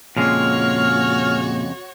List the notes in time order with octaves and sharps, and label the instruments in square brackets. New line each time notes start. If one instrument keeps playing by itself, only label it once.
[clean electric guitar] F2 C#3 G#3 [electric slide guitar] A#2 [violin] F#4 C#5 [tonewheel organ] F6